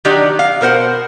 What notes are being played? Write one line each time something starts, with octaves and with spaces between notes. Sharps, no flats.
D#3 F#3 D4 G4
F5
B2 A#4 C5 F#5